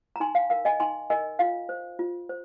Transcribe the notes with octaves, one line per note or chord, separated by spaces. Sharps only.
A#5
D#4 G#5 C6
F5
A#4 F5
D#5 G#5
D#4 G#5 C6
A#4 D#5 G#5
F4 F5
C5
F4
C5